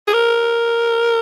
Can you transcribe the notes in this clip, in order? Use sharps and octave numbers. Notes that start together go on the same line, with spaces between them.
G#4
A#4